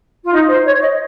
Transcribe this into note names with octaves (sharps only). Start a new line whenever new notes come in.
F4
D#4
C5
C#5
D#5